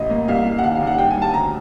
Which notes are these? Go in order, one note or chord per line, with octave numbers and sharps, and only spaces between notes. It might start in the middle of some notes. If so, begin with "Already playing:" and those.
Already playing: A1 D#5
A#3
C2 F5
C2
F#5
D#2 F5
F5
D#2
F#5
G2 G5
G#5
G2
A5
D2 A#5